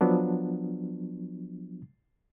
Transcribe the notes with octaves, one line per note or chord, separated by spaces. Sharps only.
F3 F#3 B3 D4